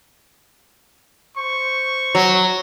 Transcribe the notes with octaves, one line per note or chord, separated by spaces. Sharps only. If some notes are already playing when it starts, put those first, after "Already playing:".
C5 C#6
F#3